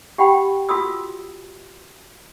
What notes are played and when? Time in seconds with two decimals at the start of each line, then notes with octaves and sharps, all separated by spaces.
0.18 G4 F#5 G5 B5
0.69 F4 F#4 A4 B5 D#6 E6